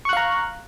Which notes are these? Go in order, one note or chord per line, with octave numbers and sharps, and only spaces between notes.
F5 A#5 C#6 F#6